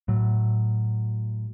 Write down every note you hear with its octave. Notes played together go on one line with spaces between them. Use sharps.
A2 F#3